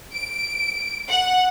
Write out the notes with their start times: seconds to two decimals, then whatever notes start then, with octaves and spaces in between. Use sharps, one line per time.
0.14 D7
1.09 F#5